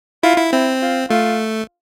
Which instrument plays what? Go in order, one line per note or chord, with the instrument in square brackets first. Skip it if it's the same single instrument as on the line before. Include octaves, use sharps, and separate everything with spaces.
[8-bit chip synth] E4 [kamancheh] F4
[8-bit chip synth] E4
[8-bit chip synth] C4 [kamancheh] E4
[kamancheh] F4
[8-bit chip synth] A3 [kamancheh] F4